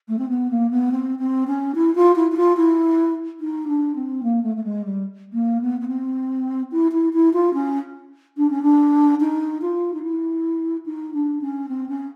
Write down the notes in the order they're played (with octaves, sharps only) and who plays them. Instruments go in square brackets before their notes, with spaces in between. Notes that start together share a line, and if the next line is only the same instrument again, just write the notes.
[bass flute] A3
C4
B3
A#3
B3
C4
C4
C#4
E4
F4
E4
E4
F4
E4
D#4
D4
C4
A#3
A3
A3
G#3
G3
A#3
B3
B3
C4
E4
E4
E4
F4
C#4
D4
C#4
D4
D#4
F4
D#4
E4
D#4
D4
C#4
C4
C#4